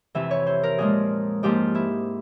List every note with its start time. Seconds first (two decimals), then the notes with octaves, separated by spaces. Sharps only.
0.15 F2 C3 E3 E5
0.31 C#5
0.46 C5
0.63 A#4
0.78 A#2 F3 G#3 G#4
1.43 G#2 F3 A#3 G4
1.75 E4